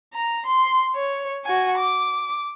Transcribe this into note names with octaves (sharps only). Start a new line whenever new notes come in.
A#5
C6
C#5
F#4 G#5
D6